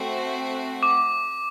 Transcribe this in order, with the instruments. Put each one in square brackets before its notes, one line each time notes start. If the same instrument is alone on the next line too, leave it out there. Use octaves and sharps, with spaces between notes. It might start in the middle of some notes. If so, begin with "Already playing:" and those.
Already playing: [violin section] A3 C4 F#4
[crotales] D6